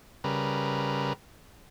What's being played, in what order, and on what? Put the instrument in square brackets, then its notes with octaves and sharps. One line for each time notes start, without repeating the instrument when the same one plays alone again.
[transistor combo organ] C#3 G3 A#4 B4